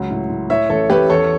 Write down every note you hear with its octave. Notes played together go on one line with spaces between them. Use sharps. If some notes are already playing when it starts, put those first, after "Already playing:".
Already playing: C#2 F#3
A2
A2
A2 C#5 E5
A1 A4 C#5
A1 G4 B4
E2 A4 C#5